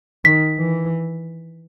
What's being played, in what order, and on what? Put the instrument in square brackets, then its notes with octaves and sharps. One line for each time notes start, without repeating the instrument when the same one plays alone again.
[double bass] D#3 [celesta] B6
[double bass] E3